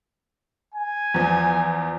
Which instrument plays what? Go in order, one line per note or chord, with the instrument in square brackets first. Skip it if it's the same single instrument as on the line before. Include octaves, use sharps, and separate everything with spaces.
[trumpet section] G#5
[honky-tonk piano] E2 F3